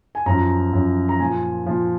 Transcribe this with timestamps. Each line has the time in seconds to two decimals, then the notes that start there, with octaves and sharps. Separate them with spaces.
0.15 G#5
0.26 F#2 F3 A#5
0.73 F#2 F3
1.09 A#5
1.19 A#2 F3 G#5
1.66 A#2 F3